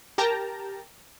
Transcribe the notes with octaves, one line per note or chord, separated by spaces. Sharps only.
G4 A#4 G5 A5 A#5